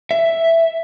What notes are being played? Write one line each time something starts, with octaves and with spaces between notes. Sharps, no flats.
E5